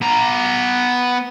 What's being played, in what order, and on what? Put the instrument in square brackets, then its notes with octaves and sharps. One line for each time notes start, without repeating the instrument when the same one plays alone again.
[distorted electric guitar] B3 A#5